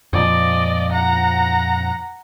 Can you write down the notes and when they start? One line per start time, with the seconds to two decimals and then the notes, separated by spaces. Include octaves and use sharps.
0.13 F2 A#2 F3 D5 D#5
0.92 F#5 A#5